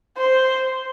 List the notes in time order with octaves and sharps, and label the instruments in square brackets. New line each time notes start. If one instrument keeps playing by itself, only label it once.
[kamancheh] C5